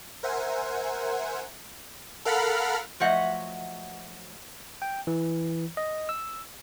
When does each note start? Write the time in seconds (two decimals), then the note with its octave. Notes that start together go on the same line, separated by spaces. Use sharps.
0.23 A#4 C5 E5 F#5 G#5
2.25 A4 A#4 F5 F#5 B5 F6
3.00 F3 F#3 A3 D#5 E5 F#5
4.82 G5
5.07 E3
5.77 D#5
6.09 E6